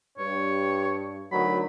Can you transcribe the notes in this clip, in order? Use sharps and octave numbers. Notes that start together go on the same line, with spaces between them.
G2 C#5
D2 D#3 F#3 B5